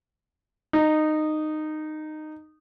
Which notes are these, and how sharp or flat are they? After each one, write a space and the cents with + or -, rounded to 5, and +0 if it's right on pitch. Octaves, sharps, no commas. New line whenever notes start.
D#4 -15